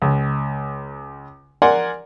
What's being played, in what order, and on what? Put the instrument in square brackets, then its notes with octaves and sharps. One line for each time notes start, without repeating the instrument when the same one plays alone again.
[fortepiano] C#2
A#4 D5 F#5 G#5 C6